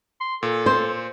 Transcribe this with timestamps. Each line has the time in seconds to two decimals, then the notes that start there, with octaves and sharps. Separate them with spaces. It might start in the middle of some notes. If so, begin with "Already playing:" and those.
0.21 C6
0.43 A#2 A4
0.66 C5